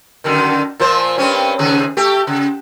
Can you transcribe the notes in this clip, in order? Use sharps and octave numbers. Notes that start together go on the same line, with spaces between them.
F#2 D3 D#3
A#2 F3 C5
G2 C4 C#4
D#2 C#3 G#4
A3 G4
C#3